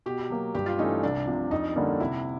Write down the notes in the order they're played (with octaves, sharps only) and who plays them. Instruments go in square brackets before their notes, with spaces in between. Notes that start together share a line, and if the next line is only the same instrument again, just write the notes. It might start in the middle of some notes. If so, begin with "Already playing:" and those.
[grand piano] B2 [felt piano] G4
[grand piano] F#3 A#3
[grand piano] G2 [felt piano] G4
[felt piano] F4
[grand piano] E3 A3 C#4 [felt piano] D#4
[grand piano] C2 [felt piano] D4
[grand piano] C3 F3
[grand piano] F2 [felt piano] D#4
[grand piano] D3 G3 A#3 C#4
[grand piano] C3 [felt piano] E4